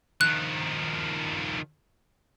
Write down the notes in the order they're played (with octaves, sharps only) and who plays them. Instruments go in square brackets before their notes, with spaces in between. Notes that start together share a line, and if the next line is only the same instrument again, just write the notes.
[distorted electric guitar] D#3 F3 [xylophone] F#6